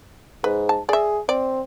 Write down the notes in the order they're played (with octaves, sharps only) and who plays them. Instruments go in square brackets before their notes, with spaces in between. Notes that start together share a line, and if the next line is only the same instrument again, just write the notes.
[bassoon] G#2 [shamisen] B4
[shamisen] A5
[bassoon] G#4 [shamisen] D5 E5
[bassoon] C4 [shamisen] D5